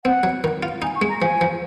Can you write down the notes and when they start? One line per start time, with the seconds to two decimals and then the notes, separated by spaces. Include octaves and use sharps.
0.05 C4 F#5
0.23 F#3
0.44 D#3
0.63 F4
0.82 D#4 G#5
0.95 C#6
1.02 G#3
1.08 A#5
1.21 F3 G#5
1.41 F3